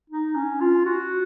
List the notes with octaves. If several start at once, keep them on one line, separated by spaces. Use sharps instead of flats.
D#4
C#4
F4
F#4